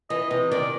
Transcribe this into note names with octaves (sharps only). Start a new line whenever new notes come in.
E3 D#5
C3 D#5
D#3 D5